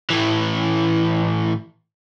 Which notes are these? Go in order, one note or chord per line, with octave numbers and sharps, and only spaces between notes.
A2 E3